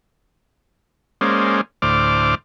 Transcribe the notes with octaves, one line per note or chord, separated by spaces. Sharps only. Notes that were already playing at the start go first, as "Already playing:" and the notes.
G#3 A#3 C#4 C5 D5
D2 A2 C5 D5 D6 F6